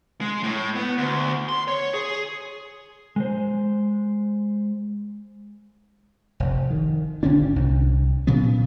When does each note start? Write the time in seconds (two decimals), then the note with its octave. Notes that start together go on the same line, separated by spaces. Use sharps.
0.21 G#3
0.43 A2
0.76 B3
0.98 D2
1.49 C6
1.68 C#5
1.94 G#4
3.16 G#3 C5
6.40 F1
6.71 D#3
7.23 G#1 D3 C#4 D4
7.56 C2
8.27 A#2 C#3 F#3 B3